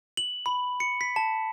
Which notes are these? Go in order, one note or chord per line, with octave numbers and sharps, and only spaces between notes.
F#7
B5
C#7
B6
A5